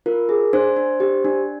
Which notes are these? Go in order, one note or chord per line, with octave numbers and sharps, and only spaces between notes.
F4 A#4
G#4
D4 C5
D4
G4
D4